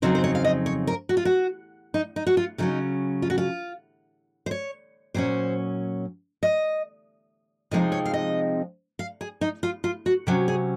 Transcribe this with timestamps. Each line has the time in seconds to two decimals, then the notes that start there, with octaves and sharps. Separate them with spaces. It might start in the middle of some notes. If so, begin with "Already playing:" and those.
0.02 F2 C#3 F#3 C4 D#4 C5
0.15 C5
0.24 C#5
0.35 F5
0.44 D#5
0.66 C#5
0.87 A#4
1.09 F#4
1.17 F4
1.25 F#4
1.94 D#4
2.16 D#4
2.27 F#4
2.37 F4
2.58 C#3 F#3 C#4 D#4
3.22 F4
3.30 F#4
3.38 F4
4.46 C5
4.51 C#5
5.14 A#2 F#3 C#4 C5
6.43 D#5
7.71 C3 F3 G#3 C4 D#4 D#5
7.92 C#5
8.06 F5
8.14 D#5
8.99 F5
9.21 G#4
9.41 D#4
9.63 F4
9.84 F4
10.06 F#4
10.27 C3 F#3 C#4 F#4
10.48 G#4